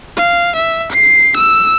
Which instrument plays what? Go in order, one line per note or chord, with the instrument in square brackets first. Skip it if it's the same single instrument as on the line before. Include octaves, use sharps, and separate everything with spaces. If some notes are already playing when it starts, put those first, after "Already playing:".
[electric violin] F5
E5
C7
E6